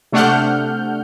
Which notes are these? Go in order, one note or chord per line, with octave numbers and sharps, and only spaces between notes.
C3 A3 D4 F#5 F6 G6